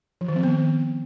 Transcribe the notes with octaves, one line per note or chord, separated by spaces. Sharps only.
F3
D#3
C4
B3